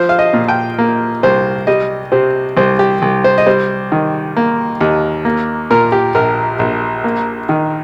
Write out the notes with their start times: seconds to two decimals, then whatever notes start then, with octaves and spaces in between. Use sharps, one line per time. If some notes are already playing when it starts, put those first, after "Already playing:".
Already playing: F3 C5
0.09 F5
0.19 D#5
0.34 A#2
0.48 G5
0.79 A#3
1.23 C2 C5
1.67 G3 D#5
2.12 C3 C5
2.57 C2 C5
2.79 G4
3.02 C2
3.24 C5
3.38 D#5
3.46 G3 C5
3.92 D#3
4.37 A#3
4.81 D#2
5.25 A#3
5.70 A#2 A#4
5.92 G4
6.15 A#1 A#4
6.59 A#1
7.04 A#3
7.49 D#3